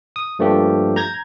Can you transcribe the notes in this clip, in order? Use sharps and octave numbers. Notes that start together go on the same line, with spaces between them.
D#6
G2 F3 A3 A#3 D4 G4
A#5 G6 G#6 A#6